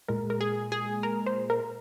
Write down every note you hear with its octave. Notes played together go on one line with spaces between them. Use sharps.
A#2 G#3 A#4
A#4
G#4
G#4
A#4
C5
A#4